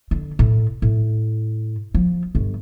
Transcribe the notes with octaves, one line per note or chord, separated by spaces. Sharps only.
D3
A2
A2
F3
G1